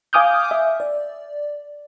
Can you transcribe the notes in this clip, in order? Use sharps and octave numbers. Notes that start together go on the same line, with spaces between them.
F5 G#5 D6 D#6 F6 G6
E5
D5